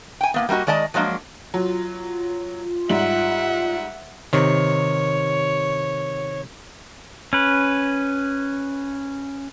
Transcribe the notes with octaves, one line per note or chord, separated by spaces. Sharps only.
G5 G#5
A2 A#3 B3
G3 A#3 E4 F#4 D#5
D#3 G#3 D5 D#5 A5
F3 F#3 G#3 A#3 D4
F#3 F4
G#2 G3 E5 F#5 F#7
C3 D#3 C#5
C#4 B4